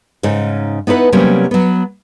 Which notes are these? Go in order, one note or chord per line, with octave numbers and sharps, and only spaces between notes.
G#2 C#3 C#4 D#4
B3 D#4 E4 B4 F#5
C3 F#3 G3 A#3 B3 C#4
F#3 B3